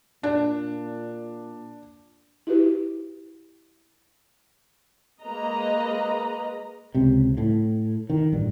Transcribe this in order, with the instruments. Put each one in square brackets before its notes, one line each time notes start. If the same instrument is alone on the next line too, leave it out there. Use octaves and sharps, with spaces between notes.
[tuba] A#2 [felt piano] D4
[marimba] E4 F#4 G4 B4
[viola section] G#3 A#3 B4 D#5 A#5
[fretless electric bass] C#2 C3
A2
D#3
A1 G2